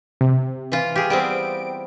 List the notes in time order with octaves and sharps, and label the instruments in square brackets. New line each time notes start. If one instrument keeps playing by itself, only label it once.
[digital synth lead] C3
[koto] E3 F4
G4 G#4
[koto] G3 B3 C4 [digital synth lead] D7